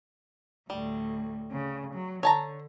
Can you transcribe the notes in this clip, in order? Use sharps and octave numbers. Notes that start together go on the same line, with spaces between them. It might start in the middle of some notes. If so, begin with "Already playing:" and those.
D2 A2 G3
C#3
F#3
D3 C#5 A5 A#5